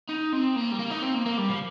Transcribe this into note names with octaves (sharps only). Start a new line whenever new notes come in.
D#4
C4
A#3
G3
A#3
D#4
C4
A#3
A#3
G3
F3